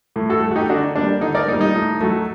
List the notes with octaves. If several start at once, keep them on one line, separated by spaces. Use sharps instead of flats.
A2
F#4 A4
A3
F#4
D#4 G4
D3 D4 F#4
G3 A#3 D4
D3 D#4
A#4 D5
G3 A#3 D#4
D#4
A2
F#3 A3